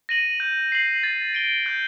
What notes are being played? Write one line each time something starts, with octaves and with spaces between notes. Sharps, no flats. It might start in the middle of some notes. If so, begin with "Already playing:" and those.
A#6 D#7 F#7
G6
C7 F#7
A6
D7 G7
G6